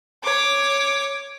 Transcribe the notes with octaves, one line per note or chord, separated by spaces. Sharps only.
C#5 D6